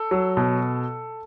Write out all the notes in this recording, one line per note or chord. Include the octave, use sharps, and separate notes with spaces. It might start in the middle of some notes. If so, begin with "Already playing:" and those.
Already playing: A4
F#3
B2